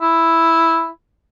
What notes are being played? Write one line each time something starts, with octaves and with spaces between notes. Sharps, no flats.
E4